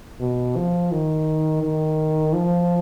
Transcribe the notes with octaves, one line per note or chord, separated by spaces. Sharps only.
B2
F3
D#3
D#3
F3